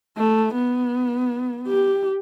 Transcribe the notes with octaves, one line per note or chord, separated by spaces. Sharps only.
A3
B3
G4